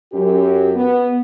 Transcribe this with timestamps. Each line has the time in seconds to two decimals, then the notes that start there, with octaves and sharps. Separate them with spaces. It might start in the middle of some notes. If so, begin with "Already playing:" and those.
0.13 F#2 G4
0.76 B3